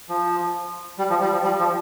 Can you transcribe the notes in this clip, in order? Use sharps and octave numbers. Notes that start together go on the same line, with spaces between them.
F3
G3
F3
G3
F3
G3
F3